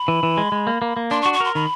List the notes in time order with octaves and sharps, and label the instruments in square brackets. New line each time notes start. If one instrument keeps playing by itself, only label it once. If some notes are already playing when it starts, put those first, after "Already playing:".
Already playing: [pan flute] B5
[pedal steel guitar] E3
E3
G#3
G#3
A#3
A#3
A#3
[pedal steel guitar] D4 [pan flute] C6
[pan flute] C#6
[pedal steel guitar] F#4
[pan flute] C#6
[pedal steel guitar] A#4 [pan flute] C6
[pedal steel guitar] D#3 [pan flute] B5